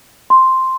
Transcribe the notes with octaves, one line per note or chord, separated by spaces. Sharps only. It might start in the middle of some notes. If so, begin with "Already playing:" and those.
C6